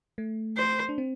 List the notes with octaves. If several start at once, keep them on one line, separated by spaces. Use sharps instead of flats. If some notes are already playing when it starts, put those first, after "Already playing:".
A3
C5
D4
C4